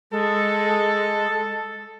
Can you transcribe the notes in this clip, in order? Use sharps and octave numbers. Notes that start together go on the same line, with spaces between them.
G#3 A4